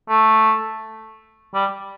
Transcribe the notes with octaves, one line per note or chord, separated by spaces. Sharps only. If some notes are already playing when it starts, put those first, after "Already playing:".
A3
G3